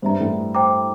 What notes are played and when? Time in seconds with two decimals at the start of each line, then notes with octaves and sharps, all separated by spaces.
0.02 G2 C5 E5 A#5
0.20 A2
0.54 C5 G5 A#5 D6